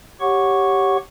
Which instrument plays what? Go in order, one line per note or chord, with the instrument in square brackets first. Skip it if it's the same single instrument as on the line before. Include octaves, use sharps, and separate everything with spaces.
[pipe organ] G4 C#5 F#5 C#6